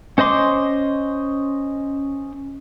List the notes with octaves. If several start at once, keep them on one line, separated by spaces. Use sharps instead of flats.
C#4 C5 D#5 C6 D6